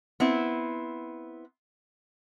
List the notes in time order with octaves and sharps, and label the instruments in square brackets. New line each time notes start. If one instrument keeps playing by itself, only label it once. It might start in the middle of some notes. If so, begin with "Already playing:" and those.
[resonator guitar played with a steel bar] B3 C4 E4